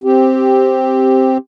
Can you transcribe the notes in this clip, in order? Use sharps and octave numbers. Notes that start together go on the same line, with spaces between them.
C4 G4